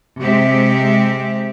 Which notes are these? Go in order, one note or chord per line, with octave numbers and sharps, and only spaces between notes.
C3 G#3 C4 G4 E5